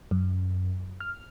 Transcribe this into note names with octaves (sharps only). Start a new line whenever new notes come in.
F#2
F6